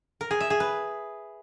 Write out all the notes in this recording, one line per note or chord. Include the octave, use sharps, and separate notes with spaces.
A#4
G#4
E5
G#4
B4